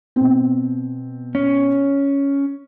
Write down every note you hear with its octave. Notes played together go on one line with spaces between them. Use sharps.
B2 C4
C#4